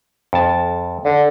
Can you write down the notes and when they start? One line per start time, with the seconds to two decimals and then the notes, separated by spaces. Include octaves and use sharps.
0.33 F2 A5
1.05 D3